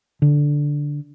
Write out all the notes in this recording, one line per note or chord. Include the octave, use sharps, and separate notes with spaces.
D3